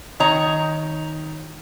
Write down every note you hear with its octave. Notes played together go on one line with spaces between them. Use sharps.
D#3 C#5 A#5